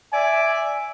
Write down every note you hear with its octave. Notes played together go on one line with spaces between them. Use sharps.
D5 E5 G#5